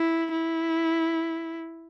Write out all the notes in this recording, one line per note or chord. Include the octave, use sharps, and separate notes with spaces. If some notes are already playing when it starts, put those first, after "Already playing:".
Already playing: E4
E4